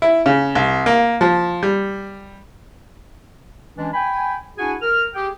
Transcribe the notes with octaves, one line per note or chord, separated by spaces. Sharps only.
E4
C#3
C2
A#3
F3
G3
E3 G#3 C#4 D4
G5 G#5 B5
D4 E4 F#4 G#4 F#5 G#5
A#4 F6
G4 G#4 G5